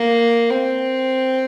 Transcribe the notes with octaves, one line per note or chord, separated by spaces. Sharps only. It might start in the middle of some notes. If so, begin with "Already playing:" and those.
Already playing: A#3
C4